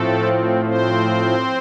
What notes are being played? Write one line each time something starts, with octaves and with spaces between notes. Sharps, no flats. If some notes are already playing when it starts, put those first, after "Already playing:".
Already playing: A2 F3 A3 C4 A4
C4 C5